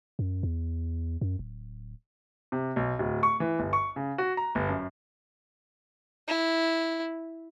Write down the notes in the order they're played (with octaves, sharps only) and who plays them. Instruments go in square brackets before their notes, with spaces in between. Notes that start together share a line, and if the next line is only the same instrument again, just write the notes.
[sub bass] F#2
E2
F#2
D1
[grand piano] C3
B1
D1
C#6
E3
G1
C#6
C#3
F#4
A#5
G1
F#2
[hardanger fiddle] E4